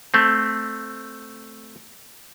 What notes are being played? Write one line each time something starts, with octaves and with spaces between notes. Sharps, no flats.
A3 C4